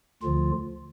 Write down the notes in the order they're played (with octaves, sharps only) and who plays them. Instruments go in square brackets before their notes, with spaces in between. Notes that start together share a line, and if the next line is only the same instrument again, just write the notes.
[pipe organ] D2 D3 F3 F4